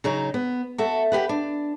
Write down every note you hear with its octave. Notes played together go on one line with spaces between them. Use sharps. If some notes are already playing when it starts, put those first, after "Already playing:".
C#3 F#3 D#4
B3
F#4 A4 E5
G4 B4 F#5
D4